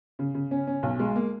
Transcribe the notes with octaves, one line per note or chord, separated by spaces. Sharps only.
C#3
C#3
C#4
C#4
B1
G#3
A#3